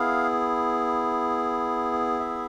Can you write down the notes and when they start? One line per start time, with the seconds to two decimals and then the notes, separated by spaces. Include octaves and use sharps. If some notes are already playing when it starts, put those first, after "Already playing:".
Already playing: B3 E4 G#4 F5
2.20 E5